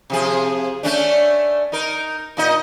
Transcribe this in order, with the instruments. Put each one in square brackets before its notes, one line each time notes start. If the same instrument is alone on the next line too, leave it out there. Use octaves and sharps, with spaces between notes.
[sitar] C3 F3 G#4
A3 C#4 D4
D#4 A#4
A#2 D#4 D#5